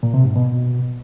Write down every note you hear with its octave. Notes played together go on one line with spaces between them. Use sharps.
A#2
C3
G#2
B2